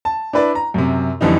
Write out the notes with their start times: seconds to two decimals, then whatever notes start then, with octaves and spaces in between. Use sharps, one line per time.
0.05 A5
0.33 D4 E4 B4 D5
0.55 A#5
0.74 F#2 C3
1.21 F2 D3 E3 G3 D#4